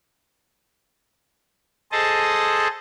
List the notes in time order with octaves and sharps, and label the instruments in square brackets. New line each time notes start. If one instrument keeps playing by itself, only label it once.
[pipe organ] G#4 A4 C5 D#5 A5